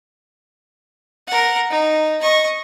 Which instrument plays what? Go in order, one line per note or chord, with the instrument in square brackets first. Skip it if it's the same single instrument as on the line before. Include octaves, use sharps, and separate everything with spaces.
[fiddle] A#4 F#5
D#4
D#5 C#6